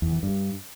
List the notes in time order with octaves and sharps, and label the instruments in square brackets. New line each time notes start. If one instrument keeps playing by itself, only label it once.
[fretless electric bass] E2
E3
G2